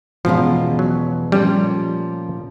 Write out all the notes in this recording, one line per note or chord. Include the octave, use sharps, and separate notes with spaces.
E2 B2 F3 G#3 C#4 F4
F#3
A#2 F3 G3 A3 C#4